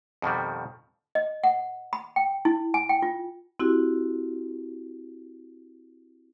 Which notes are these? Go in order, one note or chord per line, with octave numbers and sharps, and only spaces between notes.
F2 B2 D#3 G3
D#5
F#5
B5
G5
E4
G#5
G5
F4
C4 E4 F#4 G4